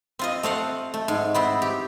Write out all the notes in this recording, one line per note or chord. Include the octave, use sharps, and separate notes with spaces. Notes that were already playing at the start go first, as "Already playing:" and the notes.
C4 F4 D#5
A3 C4 F5 F#5
A3
G#2
B3 C4 E4
G4